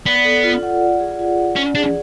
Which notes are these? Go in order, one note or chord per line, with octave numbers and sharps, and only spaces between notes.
B3 D5
A4
F4
F#5
D5
G#4
F4
F#5
C#4 D5
D4 G#4